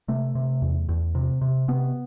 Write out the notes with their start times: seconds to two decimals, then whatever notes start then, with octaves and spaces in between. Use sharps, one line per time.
0.08 C3 A3
0.35 C3
0.62 E2
0.89 E2
1.15 C3
1.41 C3
1.68 C3 B3